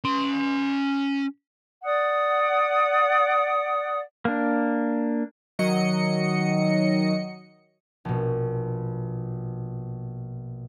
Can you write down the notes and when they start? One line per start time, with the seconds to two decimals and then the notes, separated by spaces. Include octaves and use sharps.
0.04 C#4 C6
1.83 D5 F#5 D#6
4.25 A#3 D4
5.59 D#3 F#3 D#5 C#7
8.05 A#1 B2